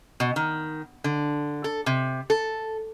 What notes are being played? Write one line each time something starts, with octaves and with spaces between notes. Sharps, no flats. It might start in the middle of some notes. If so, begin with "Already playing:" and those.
B2
D#3
D3
A4
C3
A4